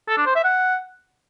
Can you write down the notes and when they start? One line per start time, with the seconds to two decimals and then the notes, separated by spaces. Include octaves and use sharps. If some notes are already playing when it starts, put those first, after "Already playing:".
0.08 A4
0.17 D4
0.26 C5
0.35 E5
0.44 F#5